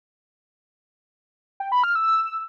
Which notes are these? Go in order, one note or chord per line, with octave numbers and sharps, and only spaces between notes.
G5
B5
F6
E6
E6